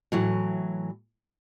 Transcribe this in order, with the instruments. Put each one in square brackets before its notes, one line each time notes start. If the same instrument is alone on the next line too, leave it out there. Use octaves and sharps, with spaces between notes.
[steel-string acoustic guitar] A2 E3 F#3